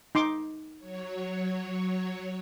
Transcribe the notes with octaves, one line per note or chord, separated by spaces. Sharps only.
D#4 C6 D6
F#3 C#5